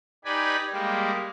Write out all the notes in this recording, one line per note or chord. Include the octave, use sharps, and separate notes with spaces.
D#4 G4 B4 D5 G#5 B5
G3 G#3 A#3 G4